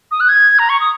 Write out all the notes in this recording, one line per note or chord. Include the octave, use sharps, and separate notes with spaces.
D#6
F#6
G#6
A#5
C#6
D#6